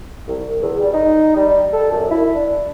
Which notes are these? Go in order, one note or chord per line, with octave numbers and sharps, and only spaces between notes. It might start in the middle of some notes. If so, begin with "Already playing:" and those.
C2
E2
G3
D#4
G3
A4
F#2
E4
D4